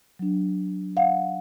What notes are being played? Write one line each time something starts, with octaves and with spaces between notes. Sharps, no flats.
F#3 D4
F5 F#5